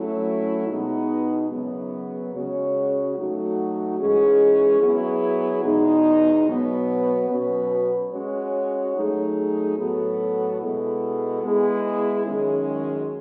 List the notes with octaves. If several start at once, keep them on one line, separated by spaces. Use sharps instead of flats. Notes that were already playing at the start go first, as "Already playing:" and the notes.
Already playing: F#3 A3 C#4 E4
B2 G#3 B3 D#4
F#2 C#3 F#3 B3
C#3 G#3 C#4 F#4 C#5
F#3 A3 D#4 F#4
G#2 E3 G#3 C#4 G#4
F#3 B3 E4 G#4
E2 B2 G#3 D#4
B2 F#3 B3
B2 F#3 C#4 F#4 B4
G#3 C#4 F#4 C#5
F#3 A3 D#4 G#4
A2 F#3 B3 F#4 A4
B2 G#3 B3 E4 A4
G#3 B3 E4 G#4
F#2 D#3 G#3 C#4 G#4